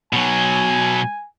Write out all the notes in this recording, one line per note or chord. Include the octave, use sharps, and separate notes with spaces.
B2 F#3 G#5